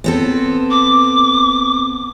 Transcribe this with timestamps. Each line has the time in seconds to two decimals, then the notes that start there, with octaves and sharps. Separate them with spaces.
0.04 B3 C4 A4
0.71 D6